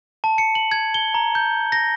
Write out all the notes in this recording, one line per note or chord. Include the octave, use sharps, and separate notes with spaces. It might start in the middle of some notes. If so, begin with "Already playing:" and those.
A5
C#7
F#7
G#6
G7
A#5
G6
A#6